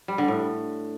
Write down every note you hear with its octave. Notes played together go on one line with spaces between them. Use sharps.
G3
D3
A2